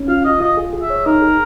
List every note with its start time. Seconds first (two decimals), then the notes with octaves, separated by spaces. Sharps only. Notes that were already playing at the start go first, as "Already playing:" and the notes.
Already playing: C#4
0.08 F4 F5
0.24 F4 D#5
0.40 F4 D#5
0.57 G#4
0.73 G#4
0.82 E5
0.90 C#5
1.06 D#4 A#4
1.22 G#4